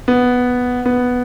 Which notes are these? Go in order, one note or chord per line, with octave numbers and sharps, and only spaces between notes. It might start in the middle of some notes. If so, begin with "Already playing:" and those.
B3
B3